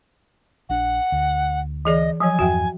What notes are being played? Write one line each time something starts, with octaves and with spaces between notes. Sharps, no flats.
A#1 D4 F#5
D2
E3 G#4 D5 D#5
F3 F#3 C#5 G#5
E2 G2 E3 F#4 E5 G5